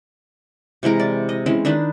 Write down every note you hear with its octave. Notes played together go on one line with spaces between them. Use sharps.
C3 E3 G#3 A#4
D5
D#5
E3 G#3 C4 C#4
D#3 D4 D#4 B4